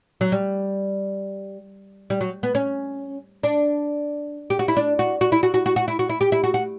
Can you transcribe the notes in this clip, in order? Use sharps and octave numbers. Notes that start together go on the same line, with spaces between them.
F#3
G3
G3
F#3
B3
C#4
D4
G4
F#4
E4
D4
F#4
F#4
E4
F#4
F#4
F#4
F#4
E4
F#4
E4
G4
E4
F#4
F#4